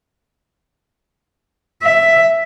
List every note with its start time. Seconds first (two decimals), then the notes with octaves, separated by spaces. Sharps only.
1.83 E5